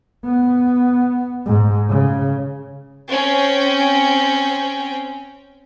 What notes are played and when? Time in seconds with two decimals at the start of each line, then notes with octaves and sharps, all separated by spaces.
0.25 B3
1.46 G#2
1.90 C#3
3.11 C4 C#4 G5